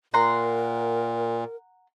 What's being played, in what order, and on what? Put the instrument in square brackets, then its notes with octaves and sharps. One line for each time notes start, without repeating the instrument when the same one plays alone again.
[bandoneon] A#2 [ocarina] A#4 [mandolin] F#5 A#5 C6